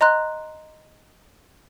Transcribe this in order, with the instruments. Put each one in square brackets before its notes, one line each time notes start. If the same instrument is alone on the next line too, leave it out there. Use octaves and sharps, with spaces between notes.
[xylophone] D#5 A#5 C6 F#6